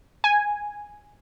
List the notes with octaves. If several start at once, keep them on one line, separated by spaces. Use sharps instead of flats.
G#5